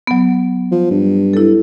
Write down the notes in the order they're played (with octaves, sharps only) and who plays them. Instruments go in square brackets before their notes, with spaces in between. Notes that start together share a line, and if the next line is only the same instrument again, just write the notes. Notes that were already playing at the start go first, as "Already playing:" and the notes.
[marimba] F#3 B3
[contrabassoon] F3
G2
[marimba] E4 A4